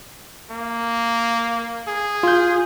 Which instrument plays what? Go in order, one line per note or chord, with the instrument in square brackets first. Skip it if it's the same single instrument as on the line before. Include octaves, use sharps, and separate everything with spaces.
[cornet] A#3
G#4
[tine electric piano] F4 G6